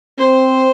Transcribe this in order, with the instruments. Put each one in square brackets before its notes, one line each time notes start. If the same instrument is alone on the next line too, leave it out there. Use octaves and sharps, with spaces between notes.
[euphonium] C4 [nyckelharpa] C5